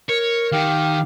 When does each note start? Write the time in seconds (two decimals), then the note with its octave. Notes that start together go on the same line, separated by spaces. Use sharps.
0.09 A#4 C#5
0.52 D#3 G4 F5